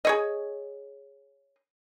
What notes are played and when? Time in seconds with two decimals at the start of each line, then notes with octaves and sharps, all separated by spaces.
0.05 G#4 C#5 D#5